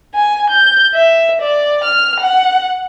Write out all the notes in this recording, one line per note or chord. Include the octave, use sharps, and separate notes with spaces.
G#5
G6
E5
D5
F6
F#5